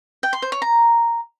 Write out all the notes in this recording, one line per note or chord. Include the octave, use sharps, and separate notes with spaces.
G5
C6
C5
C#5
A#5